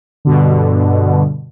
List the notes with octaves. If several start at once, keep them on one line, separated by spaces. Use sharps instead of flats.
G2 B2 D3